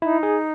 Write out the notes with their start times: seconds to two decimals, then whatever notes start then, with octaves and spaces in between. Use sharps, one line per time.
0.02 D#4 E4
0.23 G#4